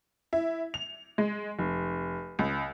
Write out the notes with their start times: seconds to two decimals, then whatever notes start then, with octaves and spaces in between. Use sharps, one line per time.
0.33 E4
0.74 F7
1.18 G#3
1.59 F1
2.39 C#2